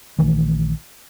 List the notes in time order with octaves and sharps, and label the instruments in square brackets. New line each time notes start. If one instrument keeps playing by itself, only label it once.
[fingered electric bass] A#1 D#3 E3 A3